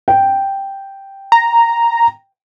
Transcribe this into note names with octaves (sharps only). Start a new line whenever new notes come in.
G5
A#5